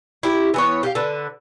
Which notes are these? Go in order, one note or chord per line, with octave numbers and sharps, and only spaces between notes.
E4 G4
E3 B3 C#5
G4 A4 F5
D3 B4